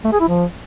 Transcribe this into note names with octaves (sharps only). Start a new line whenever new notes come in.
A3
G#4
E4
F3